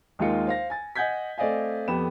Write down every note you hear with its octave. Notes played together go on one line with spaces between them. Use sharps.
D#2 G#3 A#3 D#4 F4 C#7
C5 F5 A#6
G#5 A6
D#5 F#5 G#5 G6 G#6 B6
A3 C4 D5 D#5 F5 G#5
F2 B3 G4 A4 B5 E7